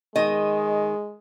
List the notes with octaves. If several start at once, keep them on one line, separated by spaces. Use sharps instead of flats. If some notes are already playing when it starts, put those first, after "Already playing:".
D#3 G#3 D#5